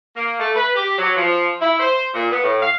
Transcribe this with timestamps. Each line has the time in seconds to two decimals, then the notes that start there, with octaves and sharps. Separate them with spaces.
0.16 A#3
0.39 A3
0.55 B4
0.75 G4
0.98 F#3
1.16 F3
1.61 E4
1.80 C5
2.14 A#2
2.31 B3
2.42 A2
2.61 F5